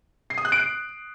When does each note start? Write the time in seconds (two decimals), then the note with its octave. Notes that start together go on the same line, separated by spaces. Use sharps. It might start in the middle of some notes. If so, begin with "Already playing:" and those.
0.30 C7
0.38 D#6
0.45 F#6
0.52 D7
0.59 F#6